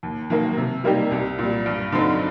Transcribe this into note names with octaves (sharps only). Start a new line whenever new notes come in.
D#2
D#3 F#3 A#3
C3
G3 A#3 D#4 G4
C2
A#2 G3
G2
D3 F#3 C4 D#4